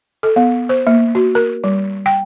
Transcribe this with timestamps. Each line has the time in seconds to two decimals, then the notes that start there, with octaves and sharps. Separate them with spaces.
0.23 A4
0.36 B3
0.69 C5
0.87 A#3
1.15 F#4
1.35 A#4
1.64 G3
2.06 G5